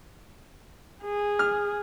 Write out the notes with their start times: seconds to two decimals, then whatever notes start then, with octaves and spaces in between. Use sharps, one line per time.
1.03 G#4
1.39 F6